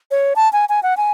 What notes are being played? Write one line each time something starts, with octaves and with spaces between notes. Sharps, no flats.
C#5
A5
G#5
G#5
F#5
G#5